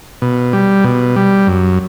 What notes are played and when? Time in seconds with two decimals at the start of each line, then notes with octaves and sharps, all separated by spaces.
0.22 B2
0.53 G3
0.84 B2
1.16 G3
1.47 F#2